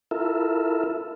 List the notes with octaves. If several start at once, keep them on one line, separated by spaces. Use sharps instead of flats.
E4 F4 A4 A#4 E5